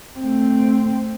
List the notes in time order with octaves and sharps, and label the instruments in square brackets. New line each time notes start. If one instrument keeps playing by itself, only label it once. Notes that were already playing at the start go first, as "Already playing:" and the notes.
[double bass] A3 C4